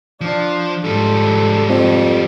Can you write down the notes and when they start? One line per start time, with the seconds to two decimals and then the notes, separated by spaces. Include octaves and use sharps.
0.21 F3 D4
0.84 G#2 F3 G3 A4
1.69 F2